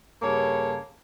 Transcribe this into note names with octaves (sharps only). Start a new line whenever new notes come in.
G2 C#3 A#3 A4 A#4 C#5